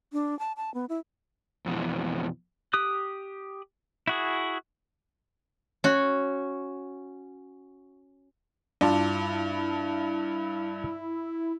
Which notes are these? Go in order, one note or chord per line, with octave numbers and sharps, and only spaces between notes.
D4
A5
A5
B3
E4
F2 B2 E3
G4 D#6 F#6
E4 F#4 G#4
C#4 F#4
G2 D4 E4 F4 D5 A5